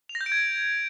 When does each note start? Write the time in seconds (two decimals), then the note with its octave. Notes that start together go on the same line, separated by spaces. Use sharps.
0.09 F7
0.15 A#6
0.21 G6
0.26 D7
0.32 G#6